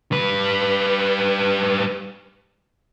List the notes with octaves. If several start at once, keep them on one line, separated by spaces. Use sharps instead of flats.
G3 B4